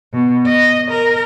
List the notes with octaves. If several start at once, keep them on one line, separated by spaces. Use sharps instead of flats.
B2
D#5
A#4